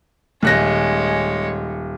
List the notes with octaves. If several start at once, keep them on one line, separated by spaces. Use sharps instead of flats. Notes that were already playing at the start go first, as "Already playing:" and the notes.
D#1 G#3 C#5 F#6 A#6